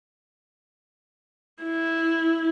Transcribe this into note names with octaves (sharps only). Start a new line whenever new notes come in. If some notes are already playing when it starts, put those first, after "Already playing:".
E4